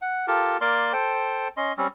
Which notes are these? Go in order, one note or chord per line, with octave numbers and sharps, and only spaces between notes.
F#5
F4 G4 A4 A#4
A#3 A#4 D5 C6
A4 C5 G5
C#4 D#5 C6
G3 C4 C#4